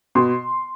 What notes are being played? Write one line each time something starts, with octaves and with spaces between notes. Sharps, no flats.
B2 C6